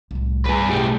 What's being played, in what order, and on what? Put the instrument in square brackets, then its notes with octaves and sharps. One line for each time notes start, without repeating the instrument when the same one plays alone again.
[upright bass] C2 A2
[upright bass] G2 [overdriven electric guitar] G#4 B4
[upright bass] B1 [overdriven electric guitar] A2 G3